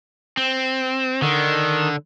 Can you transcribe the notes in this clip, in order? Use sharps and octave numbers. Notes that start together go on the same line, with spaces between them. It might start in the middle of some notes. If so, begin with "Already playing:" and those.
C4
D3 D#3